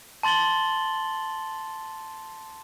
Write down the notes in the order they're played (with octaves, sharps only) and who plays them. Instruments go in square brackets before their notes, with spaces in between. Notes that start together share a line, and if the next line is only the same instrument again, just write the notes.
[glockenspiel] A5 C6 A6 F#7 G7